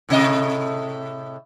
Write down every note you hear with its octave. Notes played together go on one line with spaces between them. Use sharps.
A2 C3 D#5